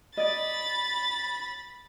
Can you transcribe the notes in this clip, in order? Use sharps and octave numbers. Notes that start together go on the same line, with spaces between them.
D5 D#5 B5 A6